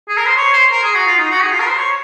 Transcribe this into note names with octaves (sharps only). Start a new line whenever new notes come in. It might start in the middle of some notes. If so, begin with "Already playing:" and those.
G#4
A#4
C5
C#5
C5
A#4
G#4
F#4
F4
D#4
F#4
G#4
F4
A#4
C5
C#5